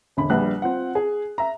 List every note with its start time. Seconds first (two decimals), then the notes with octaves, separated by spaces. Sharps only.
0.17 E1 D3 B5
0.30 A#1 G3 D4 B4 F#5 F#6
0.62 C4 F4 F#5
0.95 G#4
1.38 E5 A#5